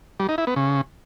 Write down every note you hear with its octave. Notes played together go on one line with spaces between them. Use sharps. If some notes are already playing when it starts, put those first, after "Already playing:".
G3
D#4
E4
B3
C#3